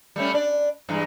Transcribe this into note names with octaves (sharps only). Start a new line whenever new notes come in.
G3 A3 C#4
D4 D5
G2 E3 G#3